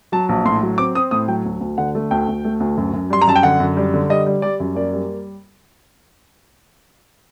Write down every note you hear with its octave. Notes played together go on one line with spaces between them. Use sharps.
F#3 A5
A#1
A2 C6
F#3
C4 D6
C4 D#6
A2 D#6
F#3 G5
D2
D2
D3 F#5
A3
D2 G5
D2
A3
D2
F#2
F#2
G3 C6
A#5
F#2 A5
G5
D3 F#5
F#2
G3
D3
G3 D#5
G3
G3 D5
F#2
A#3 D5
G3